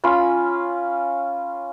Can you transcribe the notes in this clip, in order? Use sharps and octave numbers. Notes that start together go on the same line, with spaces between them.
C#4 F4 B5